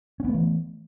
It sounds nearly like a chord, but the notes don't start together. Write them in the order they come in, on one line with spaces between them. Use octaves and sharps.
C#4 B3 A3 E3